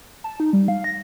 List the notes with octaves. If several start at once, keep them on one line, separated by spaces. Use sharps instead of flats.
A5
D#4
G3
F5
A#6